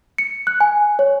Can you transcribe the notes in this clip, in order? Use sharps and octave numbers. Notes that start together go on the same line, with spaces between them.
C#7
F#6
G#5
C#5